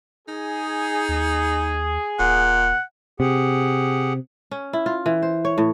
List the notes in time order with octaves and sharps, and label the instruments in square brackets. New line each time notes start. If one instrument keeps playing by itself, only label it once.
[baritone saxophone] D#4 [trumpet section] G#4
[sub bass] D#2
[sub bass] D#1 [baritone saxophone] A#2 [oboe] F#5
[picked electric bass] C3 [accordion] G4 G#4 F#5
[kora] C#4
E4
F4
E3
C5
C#5
A2